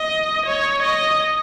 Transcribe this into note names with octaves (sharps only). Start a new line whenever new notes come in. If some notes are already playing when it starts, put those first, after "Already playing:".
Already playing: D#5
C#5
D#5